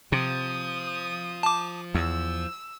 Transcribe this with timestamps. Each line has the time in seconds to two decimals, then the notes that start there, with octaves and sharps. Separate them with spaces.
0.12 C3 F3 D#6
1.43 A5 D6
1.95 E2 E6